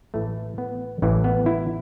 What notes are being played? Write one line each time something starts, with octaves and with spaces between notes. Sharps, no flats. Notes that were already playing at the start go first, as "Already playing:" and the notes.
A1 A2 E3 A3
B3
A1 A2 E3
B3
E4